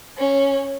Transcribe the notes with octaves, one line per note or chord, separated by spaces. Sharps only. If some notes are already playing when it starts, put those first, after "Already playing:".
C#4